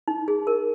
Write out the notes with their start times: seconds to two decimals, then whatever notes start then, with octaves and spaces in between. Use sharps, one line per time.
0.08 D#4
0.28 G#4
0.47 A#4